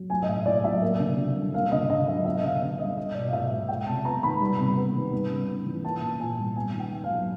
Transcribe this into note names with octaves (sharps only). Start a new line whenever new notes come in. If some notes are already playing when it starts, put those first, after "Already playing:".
Already playing: F#3
A3 G#5
D#5
A2 E5
A2 D5
F#3 E5
A#3
D3
D3
G3
A#3 F5
D3 D#5
D3 D#5
F#3 E5
B3 E5
D3 F5
D3 E5
G3 D#5
B3 D#5
B2 D5
F5
B2 E5
G#3
G#3 G5
C3 A5
B3 A#5
D#3 B5
G3
C3
B3
D#3
G3
C#3
B3
E3
A#3 A5
A#2
A#2 G#5
G3
B3 G#5
D#3
G5
D#3
F5
F#3